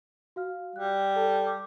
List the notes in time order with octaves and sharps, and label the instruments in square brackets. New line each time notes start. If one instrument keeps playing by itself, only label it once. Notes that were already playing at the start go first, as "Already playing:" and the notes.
[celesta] F#4 F5 F6
[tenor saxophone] G3 [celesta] F#6
[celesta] A4 A5
D6